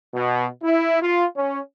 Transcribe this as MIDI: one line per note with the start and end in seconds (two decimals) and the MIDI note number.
0.14 0.45 47
0.62 1.00 64
1.01 1.23 65
1.36 1.59 61